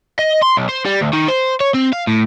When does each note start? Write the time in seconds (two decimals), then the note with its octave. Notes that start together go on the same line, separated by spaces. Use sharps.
0.19 D#5
0.43 C6
0.57 B1
0.69 C5
0.85 G3
1.01 D2
1.13 D#3
1.28 C5
1.61 C#5
1.74 C4
1.93 F5
2.07 A2